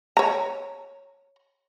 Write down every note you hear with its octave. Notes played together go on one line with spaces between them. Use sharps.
C#5 A#5